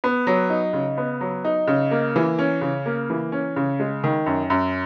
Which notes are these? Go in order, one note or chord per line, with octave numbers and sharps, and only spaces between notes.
B3
F#3
D#4
C#3
B3
F#3
D#4
C#3
A#3
E3
C#4
C#3
A#3
E3
C#4
C#3
G#3
D#3
F#2
F#2